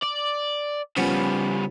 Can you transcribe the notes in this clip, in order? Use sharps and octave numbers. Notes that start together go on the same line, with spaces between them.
D5
C#3 F3 G3 B3 C#4